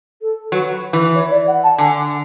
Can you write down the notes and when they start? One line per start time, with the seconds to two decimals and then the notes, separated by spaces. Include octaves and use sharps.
0.21 A4
0.52 F#3 B4
0.93 E3
1.14 C#5
1.30 D5
1.47 F#5
1.63 A5
1.78 D3 G#5